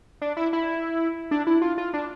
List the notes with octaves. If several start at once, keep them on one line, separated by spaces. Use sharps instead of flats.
D4
E4
E4
D4
E4
F4
F4
D4